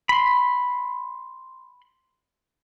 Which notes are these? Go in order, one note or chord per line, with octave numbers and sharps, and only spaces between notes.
B5 C6